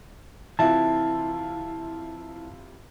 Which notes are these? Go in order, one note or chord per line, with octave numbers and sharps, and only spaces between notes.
C3 E3 E4 F4 A5